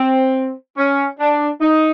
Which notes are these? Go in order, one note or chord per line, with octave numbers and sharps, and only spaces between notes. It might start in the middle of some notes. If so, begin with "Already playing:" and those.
Already playing: C4
C#4
D4
D#4